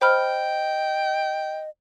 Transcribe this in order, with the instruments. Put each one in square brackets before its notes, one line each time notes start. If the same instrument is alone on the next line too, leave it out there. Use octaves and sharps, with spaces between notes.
[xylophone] C5 B5 F6 [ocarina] D#5 [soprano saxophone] G5